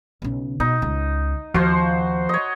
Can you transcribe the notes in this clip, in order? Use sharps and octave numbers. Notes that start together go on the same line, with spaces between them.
B1 C#3
B2 D#4
C#2
D#2 F3 F#4 C5
C#5 D#5